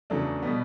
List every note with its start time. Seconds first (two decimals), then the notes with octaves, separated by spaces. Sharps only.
0.10 E2 C#3 F#3 A3 D4
0.43 B2 G3 B3